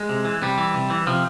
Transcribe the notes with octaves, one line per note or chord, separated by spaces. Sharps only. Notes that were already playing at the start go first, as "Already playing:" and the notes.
Already playing: G#3
C3
E3
C3 G3
E3
C3
E3
C3 F3